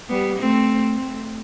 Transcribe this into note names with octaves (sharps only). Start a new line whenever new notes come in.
G3 B3
A3 C4
A3 C4